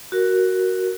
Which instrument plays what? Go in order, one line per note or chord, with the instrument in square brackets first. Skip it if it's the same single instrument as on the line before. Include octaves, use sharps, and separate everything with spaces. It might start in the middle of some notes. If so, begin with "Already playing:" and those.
[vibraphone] F#4 A#4